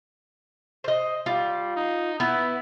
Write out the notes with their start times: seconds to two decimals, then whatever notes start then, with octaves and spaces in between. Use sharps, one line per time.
0.84 C5 D#5
1.26 G3 F4
1.76 D#4
2.20 B3 E4